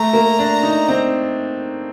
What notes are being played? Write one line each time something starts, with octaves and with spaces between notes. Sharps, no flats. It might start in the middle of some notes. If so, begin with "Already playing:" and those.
Already playing: A3 A#5
A#3
D4
D#4
C4